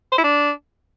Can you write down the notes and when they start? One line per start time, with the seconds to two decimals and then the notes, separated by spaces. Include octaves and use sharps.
0.12 C5
0.18 E4
0.24 D4